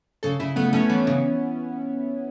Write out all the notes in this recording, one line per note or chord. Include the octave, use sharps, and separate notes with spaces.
C#3 A4
C#3 E4
A3 B3
A3 C#4
E3 B3
C#3